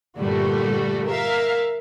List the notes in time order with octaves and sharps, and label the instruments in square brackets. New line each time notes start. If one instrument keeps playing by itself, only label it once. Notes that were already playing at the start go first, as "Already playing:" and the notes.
[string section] G2 A#2 D3 G3 A3 F#4
A#4 E5 F5